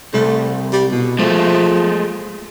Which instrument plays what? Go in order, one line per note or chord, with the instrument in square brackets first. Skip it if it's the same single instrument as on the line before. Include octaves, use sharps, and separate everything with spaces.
[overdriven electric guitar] C2 [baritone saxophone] A3
[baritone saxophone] G3
B2
[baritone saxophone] F3 [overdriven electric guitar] G#3 A3